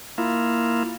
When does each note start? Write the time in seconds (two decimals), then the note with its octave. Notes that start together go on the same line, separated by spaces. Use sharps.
0.18 A#3 E4 F4